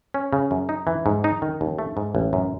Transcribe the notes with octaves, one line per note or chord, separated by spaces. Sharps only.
C#4
C#3
F#2
D#4
E3
G#2
D#4
D#3
D#2
A3
G#2
A1
F#2